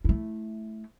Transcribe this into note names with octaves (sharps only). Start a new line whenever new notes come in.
A3 E4